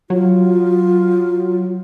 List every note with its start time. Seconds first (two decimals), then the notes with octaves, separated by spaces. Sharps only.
0.10 F#3 F4